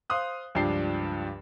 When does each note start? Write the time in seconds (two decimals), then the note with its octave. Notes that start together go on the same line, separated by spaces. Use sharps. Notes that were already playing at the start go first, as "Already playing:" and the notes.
0.10 C5 F5 C6 D#6 F#6
0.55 C#2 G2 F3 D4 G5 C7